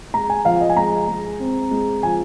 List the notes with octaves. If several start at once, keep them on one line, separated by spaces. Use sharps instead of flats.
G#3 A#5
G#5
F3 F5
D#5
G#5
G#3 A#5
G#3
C4
G#3
F3 G#5